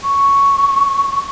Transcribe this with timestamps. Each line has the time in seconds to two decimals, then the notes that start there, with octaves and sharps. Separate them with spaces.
0.03 C#6